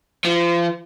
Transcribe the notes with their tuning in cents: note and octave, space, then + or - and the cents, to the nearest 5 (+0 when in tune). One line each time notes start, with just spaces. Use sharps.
F3 -30